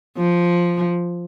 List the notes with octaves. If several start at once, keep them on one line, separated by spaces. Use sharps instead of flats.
F3